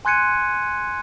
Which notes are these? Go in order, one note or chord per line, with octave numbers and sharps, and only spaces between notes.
G#5 C6 F#6 G#6 C#7 D#7